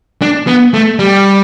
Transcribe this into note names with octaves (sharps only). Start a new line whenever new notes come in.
D4
B3
A3
G3